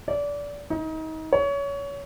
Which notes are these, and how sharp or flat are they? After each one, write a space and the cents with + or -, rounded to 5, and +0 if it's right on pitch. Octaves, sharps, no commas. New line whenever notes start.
D5 -25
D#4 +30
C#5 +25